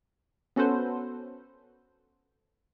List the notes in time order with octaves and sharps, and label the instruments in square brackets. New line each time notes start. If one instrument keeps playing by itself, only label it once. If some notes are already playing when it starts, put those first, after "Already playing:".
[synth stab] B3 C#4 F#4 A4 B4 C5